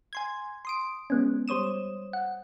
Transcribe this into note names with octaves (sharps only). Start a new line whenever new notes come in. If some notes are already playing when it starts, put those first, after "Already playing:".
G#5 C6 G#6
C6 D#6 D7
G#3 B3 C#4
G3 C5 C#5 D#6 E7
F#5